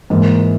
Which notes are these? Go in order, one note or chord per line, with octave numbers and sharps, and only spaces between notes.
G#2 E3 A#3 E4